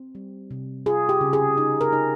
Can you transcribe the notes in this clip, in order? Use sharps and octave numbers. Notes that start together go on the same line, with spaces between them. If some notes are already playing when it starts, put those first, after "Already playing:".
Already playing: C4
G3
C3
F4 G#4
G4
C#3
G#4
D#4
A#4
D#4